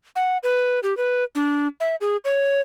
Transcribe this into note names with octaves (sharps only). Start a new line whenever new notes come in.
F#5
B4
G4
B4
D4
E5
G#4
C#5